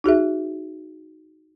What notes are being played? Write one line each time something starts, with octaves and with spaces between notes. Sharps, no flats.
D#4 F#4 G#4 E5